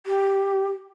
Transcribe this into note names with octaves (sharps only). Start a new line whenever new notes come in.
G4